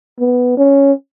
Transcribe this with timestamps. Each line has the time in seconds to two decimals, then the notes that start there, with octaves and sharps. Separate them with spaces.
0.19 B3
0.58 C#4